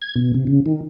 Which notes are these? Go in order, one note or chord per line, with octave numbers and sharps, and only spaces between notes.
G#6
B2
C3
C#3
D#3